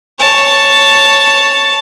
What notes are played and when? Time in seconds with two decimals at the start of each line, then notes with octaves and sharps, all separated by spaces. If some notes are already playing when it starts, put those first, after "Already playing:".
0.19 C#5 A5